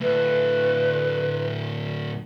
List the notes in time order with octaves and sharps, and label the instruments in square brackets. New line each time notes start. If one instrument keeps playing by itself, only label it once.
[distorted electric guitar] D2 A2 [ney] B4